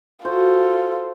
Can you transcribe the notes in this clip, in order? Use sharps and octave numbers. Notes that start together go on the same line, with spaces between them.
F4 F#4 A4 C5